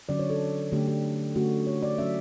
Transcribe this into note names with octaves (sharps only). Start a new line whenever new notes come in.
D3 F#3 C#4 D5
C#5
A4
D3 A3 D4 G4
G4
D3 A3 C#4 F#4
C#5
D5
F#3 C#4 E5